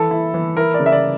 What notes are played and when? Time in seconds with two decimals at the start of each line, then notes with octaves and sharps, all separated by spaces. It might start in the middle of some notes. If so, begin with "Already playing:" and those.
Already playing: E3 A4
0.11 E4
0.34 E3
0.57 E4 A#4
0.74 D5
0.80 C#3
0.86 E5
0.92 D5